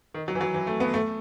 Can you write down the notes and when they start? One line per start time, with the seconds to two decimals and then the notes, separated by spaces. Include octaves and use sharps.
0.14 D#3
0.28 F#3
0.35 E3
0.41 F#3
0.54 E3
0.67 A3
0.80 B3
0.94 A3